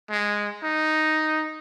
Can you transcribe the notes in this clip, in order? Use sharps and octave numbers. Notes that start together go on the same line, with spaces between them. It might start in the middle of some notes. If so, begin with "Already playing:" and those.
G#3
D#4